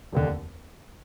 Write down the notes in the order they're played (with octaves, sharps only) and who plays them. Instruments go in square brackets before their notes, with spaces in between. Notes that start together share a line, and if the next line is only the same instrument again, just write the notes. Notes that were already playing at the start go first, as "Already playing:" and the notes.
[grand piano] F1 D#2 D3